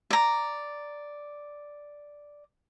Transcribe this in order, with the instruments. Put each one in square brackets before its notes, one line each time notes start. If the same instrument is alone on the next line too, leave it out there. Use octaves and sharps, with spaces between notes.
[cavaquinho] D5 A#5